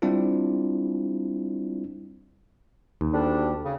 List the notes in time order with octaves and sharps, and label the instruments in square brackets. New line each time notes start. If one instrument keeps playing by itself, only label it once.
[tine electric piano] G3 C4 D4 E4 F4
[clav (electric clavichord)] D#2
[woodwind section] D2 G3 D4
C#3